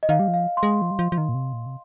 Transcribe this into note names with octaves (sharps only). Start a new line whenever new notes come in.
D#5
D#3 F5
G3
F3
F5
C6
G#3
F3
G3
F3
F3
D#3
A#2
C3
A#2
C3